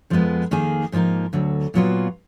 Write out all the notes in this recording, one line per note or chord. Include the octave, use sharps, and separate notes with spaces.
F2 F3 G#3 B3
F2 D#3 A#3 D#4 G#4
G#2 F3 A#3 D#4 A#4
D2 D3 F#3
A#2 F#3 B3 F4